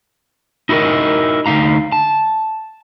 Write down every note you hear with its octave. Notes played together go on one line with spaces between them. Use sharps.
D#4 E4 F#4 A4 A#4 D#5
D2 F3 D#4 F5 A#5
A5